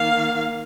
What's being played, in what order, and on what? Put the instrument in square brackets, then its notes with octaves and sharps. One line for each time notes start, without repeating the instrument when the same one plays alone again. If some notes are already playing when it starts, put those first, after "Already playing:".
Already playing: [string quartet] D#3 A#3 F5